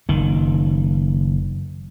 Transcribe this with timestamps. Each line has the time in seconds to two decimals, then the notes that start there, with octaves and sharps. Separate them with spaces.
0.09 F#1 D#3